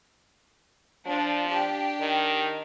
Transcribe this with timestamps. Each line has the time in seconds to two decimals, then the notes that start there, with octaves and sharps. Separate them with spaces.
1.07 F3 D4
1.47 D4 G4
2.01 D#3